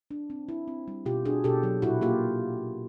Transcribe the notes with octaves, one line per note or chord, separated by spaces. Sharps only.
D4
C4
E4
C4
G3
B2 F4 G4
D4 F#4 G#4
B2 G4 A4
F#3
A#2 E4 F#4
A#3 F4 G4